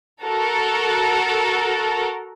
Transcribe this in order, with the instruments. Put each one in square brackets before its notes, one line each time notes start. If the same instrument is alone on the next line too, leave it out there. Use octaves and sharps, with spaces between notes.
[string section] F#4 A4 A#4